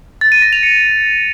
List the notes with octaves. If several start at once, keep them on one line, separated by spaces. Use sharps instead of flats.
A6
D#7
A#6
F7
C#7